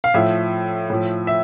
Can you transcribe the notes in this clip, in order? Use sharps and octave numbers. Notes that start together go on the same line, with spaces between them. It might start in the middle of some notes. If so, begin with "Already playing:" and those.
F5
A2 F3 E5
A2 F3
E5